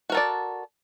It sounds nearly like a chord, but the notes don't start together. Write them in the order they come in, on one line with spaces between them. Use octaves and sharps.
F#4 A#4 A4 D5